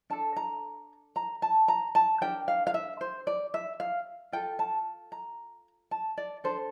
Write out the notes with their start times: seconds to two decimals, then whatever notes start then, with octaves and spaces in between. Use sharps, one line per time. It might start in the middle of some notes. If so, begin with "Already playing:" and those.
0.10 D4 A4 A5
0.36 A#5
1.16 A#5
1.42 A5
1.68 A#5
1.95 A5
2.21 D4 G4 A#4 G5
2.48 F5
2.67 F5
2.74 E5
3.01 C5
3.27 D5
3.54 E5
3.80 F5
4.32 F4 A4 G5
4.59 A5
5.12 A#5
5.91 A5
6.17 D5
6.44 D4 A4 C5